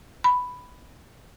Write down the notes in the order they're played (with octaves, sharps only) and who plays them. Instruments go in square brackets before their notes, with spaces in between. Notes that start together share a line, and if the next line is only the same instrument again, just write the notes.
[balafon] B5